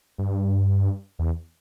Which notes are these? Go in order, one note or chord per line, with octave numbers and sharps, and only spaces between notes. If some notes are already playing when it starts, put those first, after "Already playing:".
G2
E2